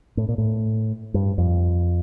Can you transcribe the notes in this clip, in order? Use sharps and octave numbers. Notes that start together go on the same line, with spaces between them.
A2
A#2
A2
G2
F2